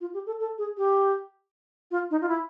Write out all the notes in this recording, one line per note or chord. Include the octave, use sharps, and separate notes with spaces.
F4
G4
A4
A4
G#4
G4
F4
D#4
F4
E4